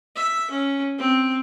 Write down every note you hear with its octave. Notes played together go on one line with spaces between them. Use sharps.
E5
C#4
C4